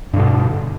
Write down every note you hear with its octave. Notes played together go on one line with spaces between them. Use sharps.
G2 B2 D3